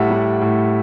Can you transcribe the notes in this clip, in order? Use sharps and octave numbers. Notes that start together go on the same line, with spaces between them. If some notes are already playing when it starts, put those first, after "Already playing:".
Already playing: A2 G3 E5 F#5
G3
A2